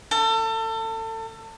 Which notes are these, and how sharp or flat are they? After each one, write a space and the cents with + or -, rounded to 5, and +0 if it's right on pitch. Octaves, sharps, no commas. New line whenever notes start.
A4 +30